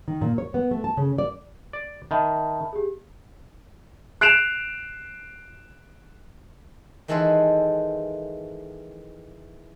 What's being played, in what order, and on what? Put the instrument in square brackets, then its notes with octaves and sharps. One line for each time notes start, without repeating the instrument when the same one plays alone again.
[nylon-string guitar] D#3
A#2
C#5
B3
A3
A5
C#3
D5
[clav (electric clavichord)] D5
[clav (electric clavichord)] D#3 [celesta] E5 A5 B5
[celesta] G4 G#4
[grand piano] F#6 C7 D7 E7 F7
[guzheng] D#3 E3 G#3 A4 B4 C5